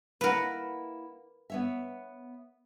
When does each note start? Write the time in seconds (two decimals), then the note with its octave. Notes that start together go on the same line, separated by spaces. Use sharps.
0.21 A#3 E4 A#4 B4 F#5
1.50 B3 C#5 E5